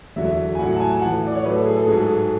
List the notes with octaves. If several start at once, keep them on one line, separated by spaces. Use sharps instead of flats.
E2 D3 F#3 E5
G#5
A2 F#3 F#5
F#5
A5
G#5
A5
A2 E3 F#5
D5
C#5
A2 F#3 B4
A4
G#4
A4
G#2 F#3 G#4
A4
G#4